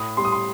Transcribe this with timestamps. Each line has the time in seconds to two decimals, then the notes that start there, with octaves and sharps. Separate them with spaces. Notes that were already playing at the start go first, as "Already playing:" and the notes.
Already playing: A2 D#6
0.17 G3 C6
0.25 D#6
0.32 C6